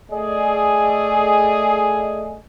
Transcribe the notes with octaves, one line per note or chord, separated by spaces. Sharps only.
A3 G#4 D5 D#5